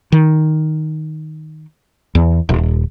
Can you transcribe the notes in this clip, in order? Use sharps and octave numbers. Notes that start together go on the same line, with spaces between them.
D#3
E2
D#1